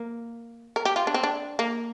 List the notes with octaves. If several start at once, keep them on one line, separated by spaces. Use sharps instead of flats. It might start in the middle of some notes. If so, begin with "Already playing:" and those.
Already playing: A#3
A#4
G4
F4
D4
C4
D4
A#3